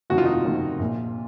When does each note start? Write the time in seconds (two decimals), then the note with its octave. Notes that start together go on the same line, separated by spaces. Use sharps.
0.10 F#1 F2 C3 D#3 F#4
0.18 F4
0.25 D#4
0.33 F4
0.45 F#1 F2 C3 D#3
0.79 A#1 A#2